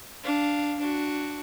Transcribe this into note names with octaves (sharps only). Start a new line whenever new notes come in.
D4 F5
D4 F#4